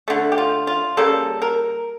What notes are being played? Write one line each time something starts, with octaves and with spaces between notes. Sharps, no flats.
D3 A3
G4
F4
F4
C#3 G3 A#3 A4
A#4